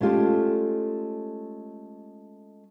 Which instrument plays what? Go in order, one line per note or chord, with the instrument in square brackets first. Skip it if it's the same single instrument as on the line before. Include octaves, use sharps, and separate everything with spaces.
[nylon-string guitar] G#3 A3 C#4 F4 G4 A4